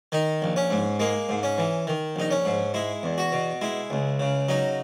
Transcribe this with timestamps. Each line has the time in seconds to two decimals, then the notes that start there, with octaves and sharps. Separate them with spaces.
0.12 D#3 D#4
0.42 A#1
0.56 C#4
0.70 G#2
1.00 G#3 A#3
1.29 G#2
1.43 C#4
1.58 E3
1.87 D#3
2.16 A#1 D#4
2.31 C#4
2.45 G#2
2.74 G#3 E4
3.03 E2
3.18 F#4
3.32 B2
3.61 G#3 E4
3.90 C#2
4.20 C#3
4.49 F#3 D#4